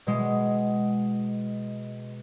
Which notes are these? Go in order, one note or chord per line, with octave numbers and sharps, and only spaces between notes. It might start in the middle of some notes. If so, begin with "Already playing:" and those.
B2 G#3